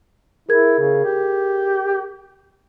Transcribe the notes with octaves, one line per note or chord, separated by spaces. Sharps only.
E4 G#4 A#4 G#6
C#3
G4